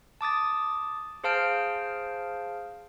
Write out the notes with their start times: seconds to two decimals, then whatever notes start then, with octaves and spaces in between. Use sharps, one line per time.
0.21 A5 D6 D#6 A6
1.24 G#4 C5 F5 A5 F6 D7